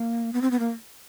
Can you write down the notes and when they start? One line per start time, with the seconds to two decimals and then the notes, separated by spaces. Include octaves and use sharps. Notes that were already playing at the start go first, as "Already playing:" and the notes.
Already playing: A#3
0.33 B3
0.42 C4
0.51 B3
0.59 A#3